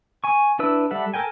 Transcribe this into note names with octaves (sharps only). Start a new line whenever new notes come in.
G#5 C#6
D4 E4 B4 E6
G3 A4 E5 F#5
A4 A#4 G5 G#5